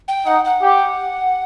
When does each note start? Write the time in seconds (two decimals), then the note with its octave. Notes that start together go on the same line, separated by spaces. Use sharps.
0.08 G5
0.26 D#4 F#5
0.45 F#5
0.62 G4